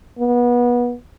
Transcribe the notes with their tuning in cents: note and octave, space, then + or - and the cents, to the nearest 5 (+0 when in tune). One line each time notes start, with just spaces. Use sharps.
B3 -25